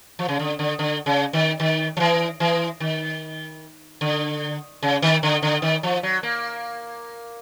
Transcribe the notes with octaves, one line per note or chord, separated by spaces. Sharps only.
F3
C#3
D3
D3
D3
C#3
D#3
D#3
F3
E3
E3
D#3
D3
C#3
D#3
D3
D3
D#3
F3
F#3
A#3